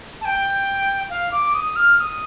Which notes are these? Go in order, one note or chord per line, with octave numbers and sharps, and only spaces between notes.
A5
G5
F5
D6
D#6
F6
F6
D#6